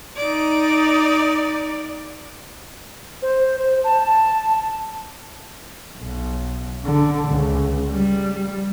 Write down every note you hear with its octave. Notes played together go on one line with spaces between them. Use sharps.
D#4 D5
C5
C5
A5
A5
B1
D3
C#2
G3